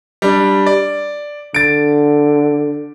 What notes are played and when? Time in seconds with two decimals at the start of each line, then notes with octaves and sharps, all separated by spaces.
0.22 G3 D4
0.66 D5
1.54 D3 A6 D7